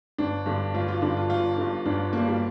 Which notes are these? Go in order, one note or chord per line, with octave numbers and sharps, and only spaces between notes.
G1 D4
G2 D3
G1 F4
F4
G2 D3 D4
F4
G1 F4
G2 D3
G1 D4
G2 D3 A#3
G3